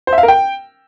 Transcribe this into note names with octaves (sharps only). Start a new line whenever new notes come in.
C5
E5
F5
A#4
G5